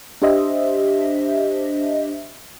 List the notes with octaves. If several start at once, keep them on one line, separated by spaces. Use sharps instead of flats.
D4 G4 C5 D#5 E5